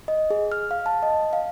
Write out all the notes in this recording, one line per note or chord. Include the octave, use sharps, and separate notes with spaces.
D#5
G#4
F6
F5
A5
D#5
F5